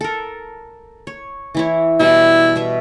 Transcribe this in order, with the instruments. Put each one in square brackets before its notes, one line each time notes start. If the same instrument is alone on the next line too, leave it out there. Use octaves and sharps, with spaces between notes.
[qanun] A4 A#4
C#5
E3 E4 C#5
[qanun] B2 G3 [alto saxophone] E4
[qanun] B2 E5